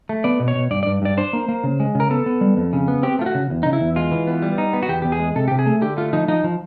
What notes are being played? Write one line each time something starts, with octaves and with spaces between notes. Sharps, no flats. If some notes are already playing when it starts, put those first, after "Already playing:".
A3
B3 D5
B2
C#5
B2
G2 D5
D5
G2
G2 D5
D4 C5
A#3
A#3
C#3
G#3
C#3
A#4
B3 A4
B3
G3
F2
C#3
B3
C4 G4
A3 F4
F#4
C#3
E2
C#3 D#4
E4
E2
G#3 F4
E3
B3
G3
D#4
B3
F#4
E2 G4
E2 G4
G#4
G#3
C3 A4
C3 G4
G#4
A3
D3 G4
A3 F4
F3 D#4
F3 D#4
F3